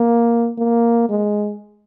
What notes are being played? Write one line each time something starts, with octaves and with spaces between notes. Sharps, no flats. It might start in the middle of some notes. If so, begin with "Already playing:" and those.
Already playing: A#3
A#3
G#3